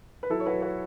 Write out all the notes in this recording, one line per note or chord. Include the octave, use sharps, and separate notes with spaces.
B4
F#3 E4 A4
C#5
F#4 B4
F#3
F#4 B4